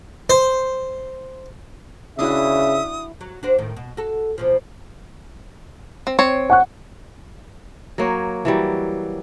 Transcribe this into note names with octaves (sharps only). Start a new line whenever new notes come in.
C5
C#3 D4 E4 F#4 E5 D#6
F#3
D4 F#4 C5
D#2 A2 D#3
B2
F#4 A4
E2 B2 F3
C4
C4 C#5
F#5 C#6 F#6
F#3 A#3 C#5
E3 F#3 G3